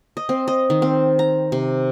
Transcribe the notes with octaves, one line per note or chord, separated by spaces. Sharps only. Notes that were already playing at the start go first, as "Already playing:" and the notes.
D#5
C4
D#5
D#3
C4
A#5
C3